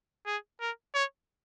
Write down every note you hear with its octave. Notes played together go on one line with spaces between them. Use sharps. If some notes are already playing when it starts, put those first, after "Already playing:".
G#4
A#4
C#5